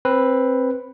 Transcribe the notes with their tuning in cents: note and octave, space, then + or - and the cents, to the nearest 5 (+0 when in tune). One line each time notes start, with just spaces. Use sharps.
C4 +15 B4 +0